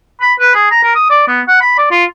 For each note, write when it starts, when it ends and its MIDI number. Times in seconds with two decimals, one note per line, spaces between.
0.21 0.32 83
0.40 0.53 71
0.55 0.71 68
0.71 0.79 82
0.83 0.92 70
0.95 1.07 87
1.10 1.24 74
1.28 1.41 59
1.48 1.56 78
1.61 1.75 83
1.78 1.87 74
1.91 2.04 65